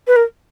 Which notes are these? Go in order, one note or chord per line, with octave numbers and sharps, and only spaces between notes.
B4
A#4